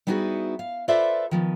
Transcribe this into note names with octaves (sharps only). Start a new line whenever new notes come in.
G3 B3 D#4 E4 F#4 G#4
F5
F4 A4 B4 C5 D5 E5
D#3 F3 B3